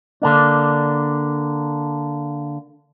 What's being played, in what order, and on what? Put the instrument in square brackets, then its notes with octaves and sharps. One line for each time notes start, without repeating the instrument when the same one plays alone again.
[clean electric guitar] D3 A#3 D4